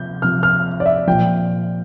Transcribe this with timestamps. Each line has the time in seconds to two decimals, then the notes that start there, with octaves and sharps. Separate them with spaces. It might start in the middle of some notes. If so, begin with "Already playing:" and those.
Already playing: C3 F3 G6
0.22 C3 F3 F6
0.43 F6
0.80 D5
0.86 E5
1.07 A#2 F3 G5